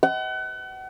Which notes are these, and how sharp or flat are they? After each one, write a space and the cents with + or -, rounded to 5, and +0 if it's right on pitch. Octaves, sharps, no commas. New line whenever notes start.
F#5 +35